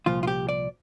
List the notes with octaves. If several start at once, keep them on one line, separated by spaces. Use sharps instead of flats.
C2 A#2 F3 F4
F4
G4
D5